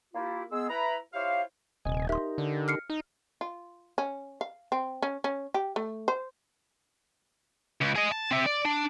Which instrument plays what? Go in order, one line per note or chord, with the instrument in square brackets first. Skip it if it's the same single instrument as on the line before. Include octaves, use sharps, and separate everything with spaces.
[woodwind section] A#3 E4 F4 G4
G#3 B3 G#4 E6
E4 B4 A#5 B5
E4 F4 G4 C5 C#5 F5
[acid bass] D#1 [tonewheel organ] C3 D#5 G#5
[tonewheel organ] D#4 G4 A#4 [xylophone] E5 C6
[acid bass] D3
[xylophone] F6 C7 C#7
[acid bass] D#4
[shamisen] F4
C#4
F5
C4
C#4
C#4
G4
A3
C5
[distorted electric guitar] C#2
G#4 D#5
A5
C4 E5
D5
D4